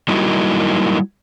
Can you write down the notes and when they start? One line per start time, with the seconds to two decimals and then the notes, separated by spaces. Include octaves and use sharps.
0.08 F#3 G3 A#3 D#4 E4 F#4